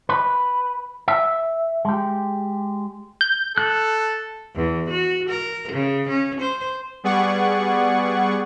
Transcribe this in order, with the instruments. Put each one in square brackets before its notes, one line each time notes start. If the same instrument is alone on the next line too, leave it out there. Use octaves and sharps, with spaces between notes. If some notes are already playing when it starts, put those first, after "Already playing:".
[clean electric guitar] B4
E5
G#3 G4
[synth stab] G6
[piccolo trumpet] A4 [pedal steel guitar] F#6
[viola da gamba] E2
F#4
A#4
C#3
C#4
C5
[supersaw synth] G3 B3 G#4 D5 F#5 C#6